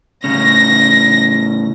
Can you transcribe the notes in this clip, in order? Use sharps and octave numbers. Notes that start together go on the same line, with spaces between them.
A2 C#3 C#4 A#6